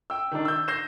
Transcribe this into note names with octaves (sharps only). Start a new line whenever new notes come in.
G5 E6
D#3 D4
E6 G6
G6 A#6 C7 E7